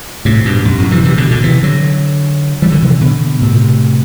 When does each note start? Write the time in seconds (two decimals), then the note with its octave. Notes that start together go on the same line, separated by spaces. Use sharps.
0.25 A2 C3
0.45 G2 B2
0.65 F#2
0.78 F#2 A2
0.91 C3 E3
1.04 C3 E3
1.17 B2 D3
1.31 B2 D3
1.44 C3 E3
1.63 D3 F#3
2.62 E3 G3
2.72 D3 F#3
2.82 C3 E3
3.01 B2 D3
3.41 A2 C3